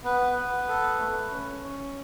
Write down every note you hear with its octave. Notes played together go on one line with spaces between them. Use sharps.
B3 B4
B3
A4
A3
C#4
C#4